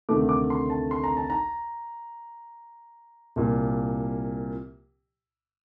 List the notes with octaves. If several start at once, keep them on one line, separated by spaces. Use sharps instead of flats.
D2 C3 D#3 A3 D6
D6
C6
A5
C6
A#5
A5
A#5
C2 A#2 F3